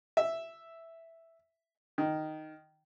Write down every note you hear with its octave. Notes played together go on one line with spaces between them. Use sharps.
E5
D#3